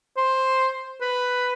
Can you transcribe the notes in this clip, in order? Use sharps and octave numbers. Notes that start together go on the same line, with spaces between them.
C5
B4